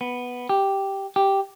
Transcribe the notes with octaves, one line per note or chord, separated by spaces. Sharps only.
B3
G4
G4